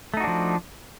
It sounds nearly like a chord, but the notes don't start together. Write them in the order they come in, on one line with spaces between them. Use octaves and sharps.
A3 D#4 F#4 D4 F3